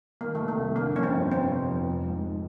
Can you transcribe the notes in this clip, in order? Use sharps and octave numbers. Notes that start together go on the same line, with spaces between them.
D#3 A#3
A3
C3
A3
C2
D3 A#3
F2 C#4
C4
G1
C3 C4
F2
F1
F3
G#2